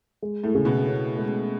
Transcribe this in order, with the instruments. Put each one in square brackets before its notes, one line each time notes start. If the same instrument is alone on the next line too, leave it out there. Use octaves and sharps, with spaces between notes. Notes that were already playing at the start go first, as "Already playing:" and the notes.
[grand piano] G#3
[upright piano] A2 A3
[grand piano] C#3
[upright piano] B2 B3
[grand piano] C#4
G#3